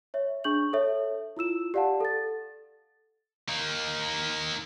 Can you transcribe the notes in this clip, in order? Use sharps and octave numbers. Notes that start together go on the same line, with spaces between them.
C#5 E5
D4 G#4 C#6 G6 F#7
A4 C#5 E5
E4 F4 E6 E7
G4 D5 F5 F#5 A5
A4 A6
A#3 D#4